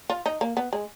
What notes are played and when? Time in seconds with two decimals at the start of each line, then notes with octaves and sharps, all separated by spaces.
0.10 F4
0.26 D#4
0.41 A#3
0.57 B3
0.73 G#3